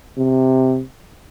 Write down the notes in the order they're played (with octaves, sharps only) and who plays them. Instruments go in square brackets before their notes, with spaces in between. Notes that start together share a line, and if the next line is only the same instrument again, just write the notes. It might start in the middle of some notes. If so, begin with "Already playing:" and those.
[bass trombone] C3